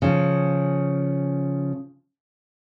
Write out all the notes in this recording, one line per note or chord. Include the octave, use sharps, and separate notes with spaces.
C#3 F3